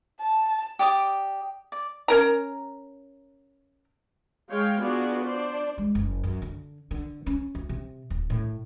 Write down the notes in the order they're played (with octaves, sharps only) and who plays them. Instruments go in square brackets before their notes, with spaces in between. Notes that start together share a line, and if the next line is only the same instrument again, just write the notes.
[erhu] A5
[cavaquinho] G4 D5 D6 D#6
D5
[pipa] C#4 A#4 A#5
[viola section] G#3 C#5 F5 G5
B3 D4 F4 F#4 G#4 D5
D4 C5 D5
[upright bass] G#3
F#1
F#2
D3
D3
C#4
D2
C3
D1
A2